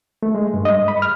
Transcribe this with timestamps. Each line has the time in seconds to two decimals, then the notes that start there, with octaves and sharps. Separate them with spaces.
0.23 A3
0.35 G#3
0.54 G2
0.65 D#5
0.88 B5
1.02 F6